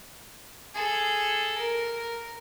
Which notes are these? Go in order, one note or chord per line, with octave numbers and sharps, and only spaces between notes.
G#4 A4
A#4